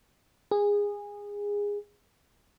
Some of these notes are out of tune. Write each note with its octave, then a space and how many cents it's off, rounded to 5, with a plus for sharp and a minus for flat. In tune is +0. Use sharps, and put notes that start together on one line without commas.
G#4 -20